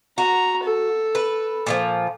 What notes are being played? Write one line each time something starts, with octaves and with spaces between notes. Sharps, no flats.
F#4 A#5
A4
B4
A#2 D#3 F3